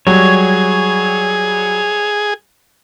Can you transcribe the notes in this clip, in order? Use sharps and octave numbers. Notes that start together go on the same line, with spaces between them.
F#3 G3 G#4 C#5